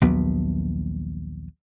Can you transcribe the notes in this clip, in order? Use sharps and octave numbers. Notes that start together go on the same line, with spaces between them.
A#1 D#2 F#3 B3